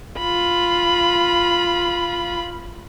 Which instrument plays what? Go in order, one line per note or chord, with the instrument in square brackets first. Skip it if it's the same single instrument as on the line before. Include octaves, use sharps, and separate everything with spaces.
[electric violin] F4 B5